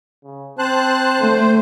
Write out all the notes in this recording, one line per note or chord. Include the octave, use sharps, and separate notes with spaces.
C#3
C4 C5 A5 F#6
D3 A3 C5